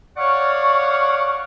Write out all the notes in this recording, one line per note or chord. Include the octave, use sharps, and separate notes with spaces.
C#5 D5 F5 F#5 C#6